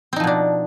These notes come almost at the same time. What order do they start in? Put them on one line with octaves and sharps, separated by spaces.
C4 D#4 F3 B2 D4